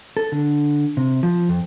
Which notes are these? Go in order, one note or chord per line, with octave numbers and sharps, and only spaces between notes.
A4
D3
C3
F3
F2